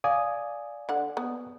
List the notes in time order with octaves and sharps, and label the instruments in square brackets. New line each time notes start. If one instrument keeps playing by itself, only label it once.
[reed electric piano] D5 G#5 D#6 [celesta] F5
[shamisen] D3 F#5
B3